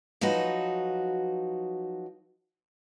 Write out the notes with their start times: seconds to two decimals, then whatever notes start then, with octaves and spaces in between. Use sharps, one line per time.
0.21 F3 F#3 D#4 F#4 B4